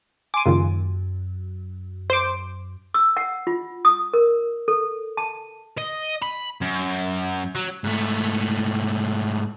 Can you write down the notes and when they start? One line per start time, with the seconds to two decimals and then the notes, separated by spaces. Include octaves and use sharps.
0.34 G#5 C6 D6 D#7
0.46 C#2 F#2 A#2 D#3
2.10 C5 D6
2.94 E6
3.17 F#5
3.47 F4
3.85 D#6
4.14 A#4
4.68 A4
5.17 A5
5.78 D#5
6.22 B5
6.62 F#2
7.55 F#3
7.84 G#2 A3